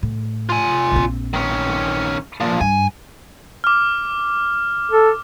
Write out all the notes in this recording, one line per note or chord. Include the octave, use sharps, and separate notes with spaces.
A2
F4 G#5
A#1 C4
D#3 C#4
A#2 F3
G2 G#5
D6 F6
A4